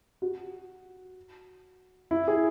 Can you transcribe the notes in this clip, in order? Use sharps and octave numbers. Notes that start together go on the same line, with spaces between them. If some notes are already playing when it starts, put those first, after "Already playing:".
F#4
E4
G#4